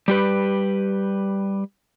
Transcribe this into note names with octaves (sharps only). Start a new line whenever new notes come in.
G3 G4 B4